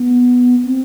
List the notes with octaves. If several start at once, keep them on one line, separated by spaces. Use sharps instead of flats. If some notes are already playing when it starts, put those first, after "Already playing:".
Already playing: B3
C4